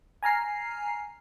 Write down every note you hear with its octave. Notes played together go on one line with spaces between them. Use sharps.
G#5 A#5 F6 C7